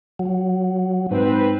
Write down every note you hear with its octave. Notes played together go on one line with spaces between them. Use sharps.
F#3
G#2 C4 B4